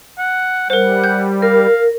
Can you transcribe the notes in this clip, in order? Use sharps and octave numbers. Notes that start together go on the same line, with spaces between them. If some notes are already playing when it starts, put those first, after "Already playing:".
F#5
G3 A#4 C5 F#5
G6
A#4 F5